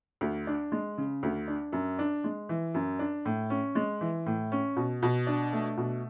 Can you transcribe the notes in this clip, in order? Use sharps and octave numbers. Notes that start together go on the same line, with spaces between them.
D2
D4
G#3
C#3
D2
D4
F#2
D4
G#3
E3
F#2
D4
A2
C#4
G#3
E3
A2
C#4
B2
B2
D4
A3
B2